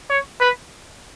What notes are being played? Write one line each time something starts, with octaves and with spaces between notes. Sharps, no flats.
C#5
B4